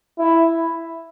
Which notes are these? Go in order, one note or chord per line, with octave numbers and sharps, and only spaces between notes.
E4